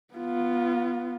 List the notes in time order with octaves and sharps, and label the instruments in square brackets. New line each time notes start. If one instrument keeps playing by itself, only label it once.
[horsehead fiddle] B3 F4